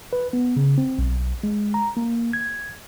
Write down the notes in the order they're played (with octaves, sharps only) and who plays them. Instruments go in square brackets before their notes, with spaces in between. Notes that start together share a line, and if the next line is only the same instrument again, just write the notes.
[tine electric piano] B4
B3
C#3
C4
B1
G#3
A#5
A#3
G#6